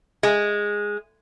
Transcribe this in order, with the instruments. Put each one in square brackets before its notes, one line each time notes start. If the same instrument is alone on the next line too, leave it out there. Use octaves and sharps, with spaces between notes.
[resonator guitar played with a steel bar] G#3